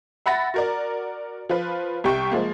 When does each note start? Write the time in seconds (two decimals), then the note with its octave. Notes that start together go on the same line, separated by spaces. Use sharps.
0.26 E5 F#5 B5 A6 A#6
0.54 F#4 A#4 D5
1.49 F3 F4 B4
2.04 C2 G3 G4 G5 C#6
2.31 F3 G#3 A#3